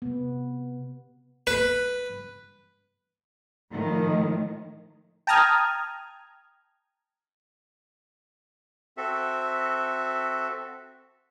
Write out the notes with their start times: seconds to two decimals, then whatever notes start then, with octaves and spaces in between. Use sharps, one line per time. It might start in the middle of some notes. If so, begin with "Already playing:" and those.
0.02 C3 B3
1.47 B4
3.71 A2 D#3 F3
5.27 G5 A5 A#5 D#6 F6 G#6
8.97 C4 F#4 A4 E5